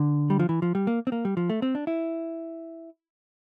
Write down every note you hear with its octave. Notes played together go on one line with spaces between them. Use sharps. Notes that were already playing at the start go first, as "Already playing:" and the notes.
Already playing: D3
G3
F3
E3
F3
G3
A#3
C4
A#3
G3
F3
A3
C4
D4
E4